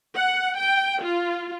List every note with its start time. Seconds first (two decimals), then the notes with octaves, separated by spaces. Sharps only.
0.15 F#5
0.58 G5
1.03 F4